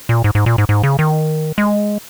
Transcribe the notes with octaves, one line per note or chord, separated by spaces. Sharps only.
A#2
G#2
G#2
A#2
G#2
G#2
C#3
D#3
G#3